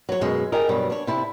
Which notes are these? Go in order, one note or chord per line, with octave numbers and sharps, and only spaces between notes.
F#3 C#5
F#2 B2 G#3
G4 G#4 A#4 D#5
G2 B2 F#3 G3
D4 C#5
C3 E4 A5